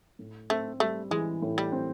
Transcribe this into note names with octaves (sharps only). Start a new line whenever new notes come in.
A2
A3 C4
G3 A3
E3 G#3
A2
G3
C4